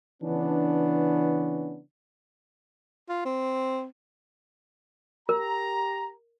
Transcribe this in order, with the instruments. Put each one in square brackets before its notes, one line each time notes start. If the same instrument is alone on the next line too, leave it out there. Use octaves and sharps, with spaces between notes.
[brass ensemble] C#3 E3 B3 C#4 D4
[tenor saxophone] F4
C4
[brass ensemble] G4 A#5 [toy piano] A#4